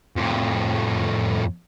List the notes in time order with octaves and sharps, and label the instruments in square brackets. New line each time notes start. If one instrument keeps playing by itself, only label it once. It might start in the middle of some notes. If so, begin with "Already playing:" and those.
[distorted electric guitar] F2 A2